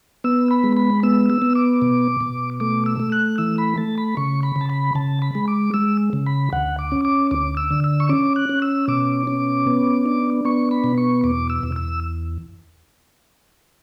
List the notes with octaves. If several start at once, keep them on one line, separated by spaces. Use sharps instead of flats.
B3 E6
B5
G#3
B5
B3 E6
E6
B3
D6
B2
B2
A3 D6
E6
A3
F#6
E3 E6
B5
A3 A5
B5
C#3 C#6
B5
C#3
A5
B5
C#3 A5
B5
G#3
D6
G#3 E6
C#3
B5
D2 F#5
D6
C#4
D6
D2 D6
E6
D3
E6
C#6
C#4 D6
F#6
C#4
E6
B2 D6
C#4
B3
D4
B3 C#6
B5
B2
C#6
E2 D6
E6
E2
E6